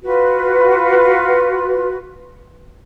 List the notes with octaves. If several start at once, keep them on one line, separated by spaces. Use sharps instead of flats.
F4 F#4 B4